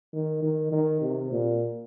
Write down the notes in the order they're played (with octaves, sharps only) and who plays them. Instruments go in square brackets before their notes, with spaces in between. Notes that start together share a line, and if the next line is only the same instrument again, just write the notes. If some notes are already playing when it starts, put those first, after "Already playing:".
[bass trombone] D#3
D#3
D#3
C3
A#2